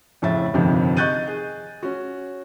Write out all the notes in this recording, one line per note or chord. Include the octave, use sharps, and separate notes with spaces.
F2 A2 C#3 E5 A6
G1 F2 C3 D#3 F3
D#5 C#6 F#6 G6 A6 D#7
G#4
C#4 F#4